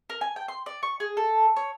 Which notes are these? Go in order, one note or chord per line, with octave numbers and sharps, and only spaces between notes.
A#4
G#5
G5
C6
D5
C#6
G#4
A4
C#5